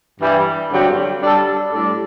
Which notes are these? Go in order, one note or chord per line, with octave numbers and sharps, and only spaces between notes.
G2 E3 G3
G2 D3 F#3 C4 G4
G3 D4 A4
A2 G3 D4 A4